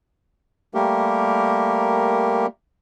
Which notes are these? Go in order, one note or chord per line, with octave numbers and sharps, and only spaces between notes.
G3 A3 A#3 G4 A#4